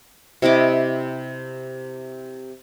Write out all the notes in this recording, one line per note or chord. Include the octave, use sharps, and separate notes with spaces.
C3 E4 D#5 D6